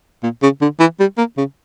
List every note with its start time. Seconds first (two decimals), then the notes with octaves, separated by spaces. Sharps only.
0.23 A#2
0.43 C#3
0.62 D3
0.80 E3
1.00 G3
1.18 A#3
1.38 C#3